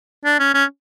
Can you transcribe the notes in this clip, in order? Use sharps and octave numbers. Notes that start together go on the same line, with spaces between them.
D4
C#4
C#4